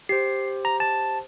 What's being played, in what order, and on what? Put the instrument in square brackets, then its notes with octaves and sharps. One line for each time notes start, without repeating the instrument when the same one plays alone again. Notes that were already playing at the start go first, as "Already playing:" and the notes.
[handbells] G4 C5 [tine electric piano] C7
[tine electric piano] A#5
A5